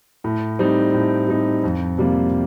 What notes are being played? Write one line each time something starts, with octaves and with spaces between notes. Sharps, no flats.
A2
G3 C4 D#4
A2
G3 C4 D#4
F2
C3 G3 A#3 F4